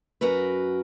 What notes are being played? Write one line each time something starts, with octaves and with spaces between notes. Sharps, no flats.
F#2 F#4 A#4 B4